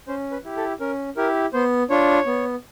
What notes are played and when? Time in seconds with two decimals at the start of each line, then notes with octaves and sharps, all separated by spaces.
0.08 C#4 C5
0.31 B4
0.44 E4 G4
0.57 A4
0.80 C#4 A#4
1.16 E4 G4 A#4
1.53 B3 C5
1.90 D4 F4 C#5
2.26 B3